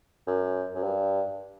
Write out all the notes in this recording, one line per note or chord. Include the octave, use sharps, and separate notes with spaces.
F#2
F#2
G2